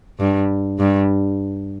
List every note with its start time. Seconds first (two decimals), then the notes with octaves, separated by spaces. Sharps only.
0.19 G2
0.79 G2